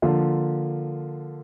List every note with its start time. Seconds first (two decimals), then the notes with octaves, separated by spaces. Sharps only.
0.02 D3 F3 A#3 F4